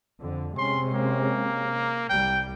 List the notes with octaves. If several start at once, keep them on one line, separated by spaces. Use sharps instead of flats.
F2 D3
C3 G#3 C#4 C6
A#3
C2 G3 G5